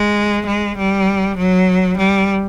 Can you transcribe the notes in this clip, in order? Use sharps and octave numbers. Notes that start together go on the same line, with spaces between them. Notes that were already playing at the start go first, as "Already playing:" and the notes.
Already playing: G#3
G#3
G3
F#3
G3